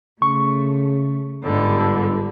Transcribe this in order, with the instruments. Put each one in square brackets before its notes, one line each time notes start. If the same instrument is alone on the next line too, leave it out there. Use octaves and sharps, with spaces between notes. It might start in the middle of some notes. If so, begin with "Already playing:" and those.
[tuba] C#3 [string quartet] A3 [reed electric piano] C#6
[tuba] G1 [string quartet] G#2 D3 G3